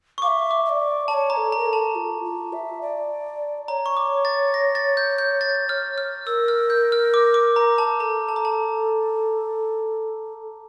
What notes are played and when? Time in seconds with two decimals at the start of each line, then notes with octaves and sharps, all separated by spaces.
0.18 C#6
0.22 F5 D6
0.27 E5
0.51 D6
0.65 E5
0.69 D5
1.08 D5 A5
1.14 C#5
1.30 A#5
1.37 A4
1.52 A#4 A#5
1.66 A4
1.73 A5
1.95 F4
2.24 F4
2.53 E5
2.81 D5
3.68 C#5 A#5
3.86 C#6
3.97 D6
4.25 A6
4.54 A#6
4.75 A6
4.97 G6
5.18 G6
5.41 A6
5.69 F6
5.98 F6
6.27 A#4 E6
6.48 F6
6.70 G6
6.92 F6
7.14 D6
7.34 D6
7.56 A#5
7.78 A5
8.00 A4 A#5
8.29 A5
8.36 A#5
8.45 A5